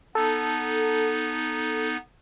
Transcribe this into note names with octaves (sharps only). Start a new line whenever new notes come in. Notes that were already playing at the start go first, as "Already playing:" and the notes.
B3 D#4 A4